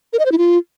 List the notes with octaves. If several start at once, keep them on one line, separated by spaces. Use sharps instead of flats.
A#4
D#5
C5
E4
F4